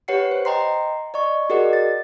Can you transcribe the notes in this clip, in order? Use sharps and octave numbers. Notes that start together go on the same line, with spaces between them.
G4 B4 C#5 F#5 C7 C#7
C5
D#5 G5 A#5 C6 C7
D5 D#5 C#6
F#4 G#4 A#4 D5 D#5 F#5
A6